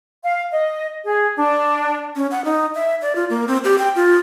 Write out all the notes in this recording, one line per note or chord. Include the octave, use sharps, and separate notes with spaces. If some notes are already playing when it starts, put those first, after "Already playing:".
F5
D#5
G#4
D4
C#4
F#5
D#4
E5
D5
F4
A#3
C4
G4
G5
F4